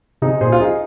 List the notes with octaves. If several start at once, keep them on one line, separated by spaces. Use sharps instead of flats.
C3 D#4 G#4
A#2 G#4 C5
F4
D#4 G#4